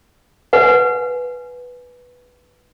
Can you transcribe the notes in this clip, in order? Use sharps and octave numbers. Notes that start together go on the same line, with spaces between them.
B4 F#5 G#5